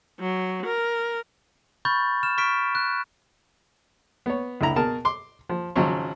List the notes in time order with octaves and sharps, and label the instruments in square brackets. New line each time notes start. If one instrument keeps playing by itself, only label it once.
[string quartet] F#3
A#4
[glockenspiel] B5 C#6 F6 G6 A6
F6 E7
C#6 F6 B6 D7
F#6
[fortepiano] B3 C#5
C#2 D3 E4 A#5
B2 G#4 A#4 A5
C6 D6
F3
G#1 C#3 F3 F#3 C#6